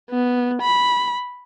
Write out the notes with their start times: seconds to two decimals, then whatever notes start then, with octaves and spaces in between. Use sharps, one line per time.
0.11 B3
0.62 B5